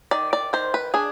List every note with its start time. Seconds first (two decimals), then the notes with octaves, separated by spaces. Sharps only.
0.11 D#3 D5
0.33 D5
0.53 D#3 C5
0.74 B4
0.94 D4 G#4